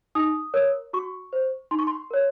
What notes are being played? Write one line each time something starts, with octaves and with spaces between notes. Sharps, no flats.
D#4 D#6
A#4 C#5
F#4 C#6
C5
D#4 C6
C#6
C6
A#4 C#5